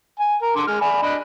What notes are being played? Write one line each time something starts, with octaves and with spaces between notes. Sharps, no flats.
G#5
A#4
D3 C6 D6
G#3 F6
D5 G#5 B5
D4 D#5 B5